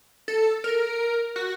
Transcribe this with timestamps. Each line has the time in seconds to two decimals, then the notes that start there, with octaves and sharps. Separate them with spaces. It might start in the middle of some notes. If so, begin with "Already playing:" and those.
0.28 A4
0.64 A#4
1.36 F#4